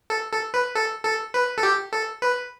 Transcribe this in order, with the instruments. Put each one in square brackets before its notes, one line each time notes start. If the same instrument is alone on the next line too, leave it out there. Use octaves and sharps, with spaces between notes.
[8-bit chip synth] A4
A4
B4
A4
A4
B4
A4
G4
A4
B4